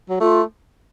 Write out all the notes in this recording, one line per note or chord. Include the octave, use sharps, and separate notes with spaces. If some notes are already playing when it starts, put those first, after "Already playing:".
F#3
A3 F4